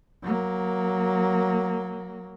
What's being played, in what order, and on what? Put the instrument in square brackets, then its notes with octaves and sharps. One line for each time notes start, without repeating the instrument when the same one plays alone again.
[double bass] F#3 A#3